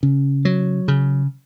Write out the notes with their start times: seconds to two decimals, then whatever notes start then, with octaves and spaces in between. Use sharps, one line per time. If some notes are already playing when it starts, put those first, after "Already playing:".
0.03 C#3
0.45 F#3
0.88 C#3